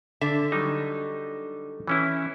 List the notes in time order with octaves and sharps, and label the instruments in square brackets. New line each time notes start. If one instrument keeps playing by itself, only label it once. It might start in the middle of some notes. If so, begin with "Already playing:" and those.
[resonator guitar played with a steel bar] D3 [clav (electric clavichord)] E5
[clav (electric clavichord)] F#3 G3 D#4
E3 C#4 E4